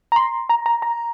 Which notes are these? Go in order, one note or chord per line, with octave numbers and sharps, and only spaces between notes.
A#5
C6
A#5
A#5
A#5